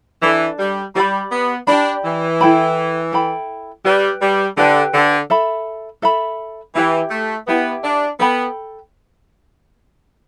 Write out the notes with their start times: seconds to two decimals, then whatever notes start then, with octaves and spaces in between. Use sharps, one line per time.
0.22 E3 D4 A4 D5
0.59 G3
0.95 G3 G4 D5 B5
1.32 B3
1.67 D4 G4 D5 B5
2.05 E3
2.41 E4 A4 G5 B5
3.12 E4 A4 G5 B5
3.85 G3 G4 B4 G5
4.22 G3
4.57 D3 G4 B4 G5
4.94 D3
5.30 A4 E5 B5
6.02 A4 E5 B5
6.75 E3 E4 G4 E5 G5
7.11 A3
7.47 B3 E4 G4 E5 G5
7.84 D4
8.19 B3 A4 G5 B5